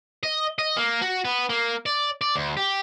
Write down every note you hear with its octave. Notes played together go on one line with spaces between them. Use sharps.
D#5
D#5
A#3
F#4
B3
A#3
D5
D5
D2
G4